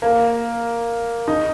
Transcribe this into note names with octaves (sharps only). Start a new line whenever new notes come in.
A#3
D#4